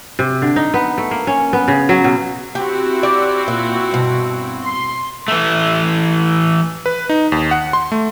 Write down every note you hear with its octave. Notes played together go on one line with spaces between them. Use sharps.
C3
D3
D#4
B3
A3
A#3
C#4
B3
C#3
F#3
B2
C4 E4 F#4 G4
G4 D5
A#2
G2 B2
C6
E3 A3
B4
D#4
D#2
F#5
C6
A3